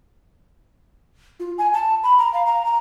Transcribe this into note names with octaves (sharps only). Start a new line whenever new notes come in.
F4
G#5
A5
B5
A#5
F5
A#5
A#5